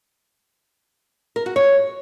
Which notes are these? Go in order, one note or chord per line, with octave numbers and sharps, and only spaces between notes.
A#4
F#4
C#5